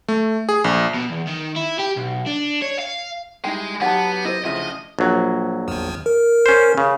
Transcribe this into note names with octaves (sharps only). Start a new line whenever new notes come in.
A3
G#4
A#1
B2
E2
D#3
E4
G4
B1
D4
C#5
F5
G3 G#3 D#4 E4 G5
F#3 B3 D#4 G4 F#5 A5
E4 C5 D#5
D2 C#3 F3 E4 F4 D#5 E5
A#1 F#3
G#1 E2
A#4
C#4 C5
C#3